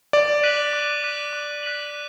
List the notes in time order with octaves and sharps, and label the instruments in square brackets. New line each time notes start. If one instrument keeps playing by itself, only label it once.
[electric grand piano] D5 [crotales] D6
[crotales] F#6 B6 D#7 F#7
D6
F#6 B6 D#7 F#7
D6
F#6 B6 D#7 F#7